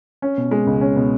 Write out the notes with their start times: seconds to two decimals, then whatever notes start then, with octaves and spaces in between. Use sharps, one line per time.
0.22 C#4
0.38 B2
0.51 G#3
0.67 C#2
0.81 C#4
0.96 B2